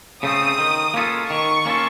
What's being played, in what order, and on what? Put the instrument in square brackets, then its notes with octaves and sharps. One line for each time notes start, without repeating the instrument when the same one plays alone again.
[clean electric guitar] C#3 A3 C4 [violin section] D#6
[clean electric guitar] D#3
A#3 C#4 F4 A4
[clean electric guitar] D#3 [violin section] C#6
[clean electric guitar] A#3 C#4 F4 A4